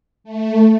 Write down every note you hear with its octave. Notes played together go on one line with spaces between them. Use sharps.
A3